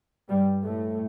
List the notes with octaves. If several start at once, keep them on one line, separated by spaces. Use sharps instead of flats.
G2 G3
A2 A3